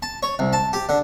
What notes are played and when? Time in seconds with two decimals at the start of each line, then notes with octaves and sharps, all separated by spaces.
0.03 A5
0.23 C#5
0.39 C2
0.53 A5
0.73 G4
0.89 D3